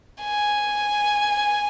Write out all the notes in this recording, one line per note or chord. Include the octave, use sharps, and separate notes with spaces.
G#5